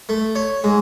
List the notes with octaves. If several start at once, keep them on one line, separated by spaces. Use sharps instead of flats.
A3
C#5
G#2